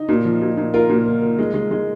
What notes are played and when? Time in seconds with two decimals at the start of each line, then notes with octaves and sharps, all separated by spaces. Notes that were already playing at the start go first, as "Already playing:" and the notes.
Already playing: D#4
0.09 A#2
0.25 F3
0.42 A#2
0.57 A#2
0.73 A#3 F4 A#4
0.89 A#2
1.06 A#3
1.22 A#3
1.39 G#3
1.54 G#3
1.71 G#3